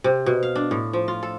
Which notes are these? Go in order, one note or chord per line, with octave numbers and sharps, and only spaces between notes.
C3
B2
F5
D4
A2
F3
F4
A4